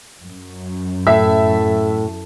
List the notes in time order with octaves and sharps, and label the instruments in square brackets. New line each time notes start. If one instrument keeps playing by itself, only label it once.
[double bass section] F#2
[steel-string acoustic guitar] A2 [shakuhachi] A4 [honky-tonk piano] E5